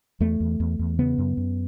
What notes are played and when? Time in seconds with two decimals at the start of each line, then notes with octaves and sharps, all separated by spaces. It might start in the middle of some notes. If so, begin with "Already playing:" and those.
0.20 E2 A3
0.40 E2
0.60 E2
0.79 E2
0.99 C#3 B3
1.18 F#2
1.37 F#2